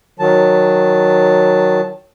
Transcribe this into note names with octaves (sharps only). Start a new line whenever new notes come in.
D#3 F#3 A5